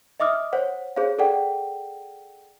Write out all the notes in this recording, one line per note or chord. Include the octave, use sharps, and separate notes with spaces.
D#5 E5 D6 D#6 F6
C5 C#5 F#5
G#4 C5 C#5 F5
G#4 A4 D5 F#5 G5